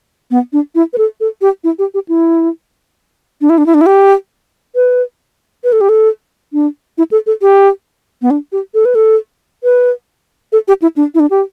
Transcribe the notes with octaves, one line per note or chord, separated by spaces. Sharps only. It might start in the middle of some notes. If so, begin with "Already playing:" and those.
B3
D4
E4
B4
A4
A4
G4
E4
G4
G4
E4
D4
E4
D4
E4
D4
E4
G4
B4
B4
A4
G4
A4
D4
E4
A4
A4
G4
B3
D4
G4
A4
B4
A4
B4
A4
G4
E4
D4
E4
D4
G4